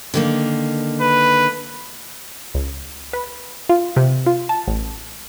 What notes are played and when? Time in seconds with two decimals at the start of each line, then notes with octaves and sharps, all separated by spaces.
0.14 D3 D#3 A#3
1.01 B4
2.54 C#2
3.13 B4
3.69 F4
3.97 C3
4.26 F4
4.49 A5
4.68 A1